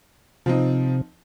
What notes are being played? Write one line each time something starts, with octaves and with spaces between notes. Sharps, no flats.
C3 F3 C4 D#4